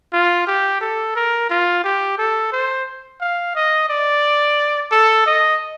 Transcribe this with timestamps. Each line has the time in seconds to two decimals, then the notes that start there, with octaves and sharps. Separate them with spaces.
0.13 F4
0.47 G4
0.81 A4
1.16 A#4
1.50 F4
1.84 G4
2.18 A4
2.52 C5
3.21 F5
3.55 D#5
3.89 D5
4.92 A4
5.27 D#5